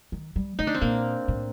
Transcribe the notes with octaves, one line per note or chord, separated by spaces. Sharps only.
D#3
G3
A3 D#4
D4
C4
A#2 A#3
A2